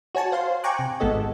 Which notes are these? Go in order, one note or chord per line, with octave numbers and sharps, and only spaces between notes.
F#4 C#5 G#5 A5
C5 F5 C6
G5 G#5 A#5 C#6 D6 F#6
C3
G#1 G#3 B3 A4 D#5